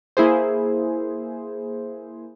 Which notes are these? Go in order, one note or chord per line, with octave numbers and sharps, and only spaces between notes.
A#3 E4 G#4 C5